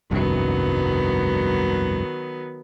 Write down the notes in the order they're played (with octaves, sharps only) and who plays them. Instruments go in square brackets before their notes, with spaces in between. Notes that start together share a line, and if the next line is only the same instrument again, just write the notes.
[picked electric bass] F1 C2 G2 [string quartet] D#3 F#3 B3